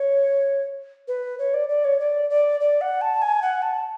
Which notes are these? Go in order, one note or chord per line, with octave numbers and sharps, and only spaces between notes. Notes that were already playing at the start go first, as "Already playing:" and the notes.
Already playing: C#5
B4
C#5
D5
D5
C#5
D5
D5
D5
F#5
A5
G#5
F#5
A5